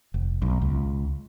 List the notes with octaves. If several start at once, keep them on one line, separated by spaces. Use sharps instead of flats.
F1
B1
C#2